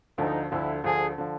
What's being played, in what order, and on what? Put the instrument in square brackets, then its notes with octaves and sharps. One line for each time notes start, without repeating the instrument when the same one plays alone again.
[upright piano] D2 D3 F3 [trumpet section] D#4
[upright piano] D2 D3 F3 [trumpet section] E4
[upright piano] D2 D3 F3 [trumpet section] G#4
[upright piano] D3 F3